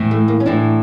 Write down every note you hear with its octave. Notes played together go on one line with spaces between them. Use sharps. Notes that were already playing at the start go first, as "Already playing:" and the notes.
Already playing: A2 E3
A3
A#3
C#4
A2 E3 D4